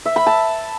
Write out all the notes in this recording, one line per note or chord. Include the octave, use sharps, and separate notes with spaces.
E5
B5
A5